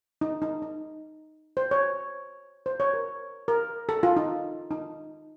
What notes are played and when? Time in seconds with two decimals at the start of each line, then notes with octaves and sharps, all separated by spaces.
0.21 D#4
0.42 D#4
0.62 D#4
1.57 C5
1.71 C#5
2.66 C5
2.80 C#5
2.94 A#4
3.48 A#4
3.89 A4
4.03 F4
4.16 D#4
4.71 D#4